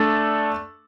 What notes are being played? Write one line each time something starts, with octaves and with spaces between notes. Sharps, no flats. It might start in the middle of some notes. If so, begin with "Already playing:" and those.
Already playing: A3 D4 A4